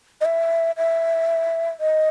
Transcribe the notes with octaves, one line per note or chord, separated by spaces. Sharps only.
D#5
E5
E5
D#5